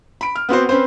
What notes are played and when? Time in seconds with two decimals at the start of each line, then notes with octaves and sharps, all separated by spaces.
0.21 B5 D7
0.36 F6
0.49 B3 C4 F#4 C5
0.69 C4 C#4 B4 C5